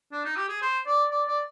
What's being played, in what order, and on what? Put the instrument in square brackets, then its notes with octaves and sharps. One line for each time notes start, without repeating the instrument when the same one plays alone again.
[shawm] D4
D#4
G4
G#4
C5
D5
D5
D5